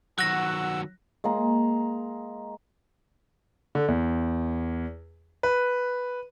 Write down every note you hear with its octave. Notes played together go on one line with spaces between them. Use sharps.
D#3 F#3 F#4 F#5 E6 F#6 A#6
G#3 A#3 A#5
D3
E2
B4